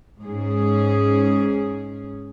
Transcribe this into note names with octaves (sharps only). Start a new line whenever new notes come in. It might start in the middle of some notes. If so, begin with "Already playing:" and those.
G#2 C#4 G#4